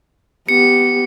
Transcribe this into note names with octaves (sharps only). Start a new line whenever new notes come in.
B3 G4 C#7